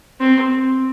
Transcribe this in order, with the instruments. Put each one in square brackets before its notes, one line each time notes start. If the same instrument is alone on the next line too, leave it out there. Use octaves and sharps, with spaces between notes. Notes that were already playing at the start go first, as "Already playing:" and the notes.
[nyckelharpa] C4